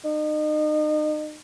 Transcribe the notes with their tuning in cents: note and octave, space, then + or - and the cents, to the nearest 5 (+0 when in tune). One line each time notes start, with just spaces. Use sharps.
D#4 -35